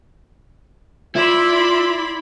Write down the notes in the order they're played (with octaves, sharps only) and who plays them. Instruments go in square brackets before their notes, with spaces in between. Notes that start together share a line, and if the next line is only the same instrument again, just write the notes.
[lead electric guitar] E4 [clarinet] F4 [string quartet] D5 B5 C6